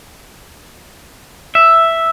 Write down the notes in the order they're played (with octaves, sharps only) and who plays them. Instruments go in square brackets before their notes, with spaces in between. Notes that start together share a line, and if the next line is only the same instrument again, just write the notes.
[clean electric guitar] E5